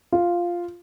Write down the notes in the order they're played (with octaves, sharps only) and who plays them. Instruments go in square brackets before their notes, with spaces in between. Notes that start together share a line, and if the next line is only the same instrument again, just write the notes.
[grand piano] F4